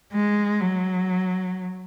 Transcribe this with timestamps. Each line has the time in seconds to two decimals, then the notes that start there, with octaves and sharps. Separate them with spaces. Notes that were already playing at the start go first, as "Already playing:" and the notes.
0.14 G#3
0.61 F#3